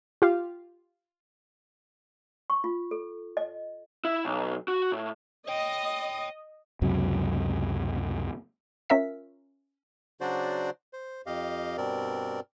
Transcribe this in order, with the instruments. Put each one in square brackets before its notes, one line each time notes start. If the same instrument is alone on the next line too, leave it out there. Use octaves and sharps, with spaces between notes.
[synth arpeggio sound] F4 G4 F5
[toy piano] C#6
F4
A4
D#5
[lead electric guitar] E4
B1
F#4
A2
[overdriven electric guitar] C#5 G5 [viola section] D#5
[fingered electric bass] C#2 F#2 C3 F#3
[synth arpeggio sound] C#4 F4 A#4 E5 B6
[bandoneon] C#3 F#3 D4 F#4 C5 D5
C5
F2 G4 D#5 F5
G2 B2 C4 A#4 D5